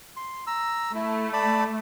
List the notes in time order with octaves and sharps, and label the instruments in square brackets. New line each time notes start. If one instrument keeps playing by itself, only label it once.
[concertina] C6
A#5 E6
[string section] A3 [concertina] E4
[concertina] D5 A5 B5